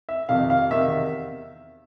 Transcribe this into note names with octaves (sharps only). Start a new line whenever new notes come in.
E5
F2 C3 D#3 F5
F5
E2 C3 D#3 E5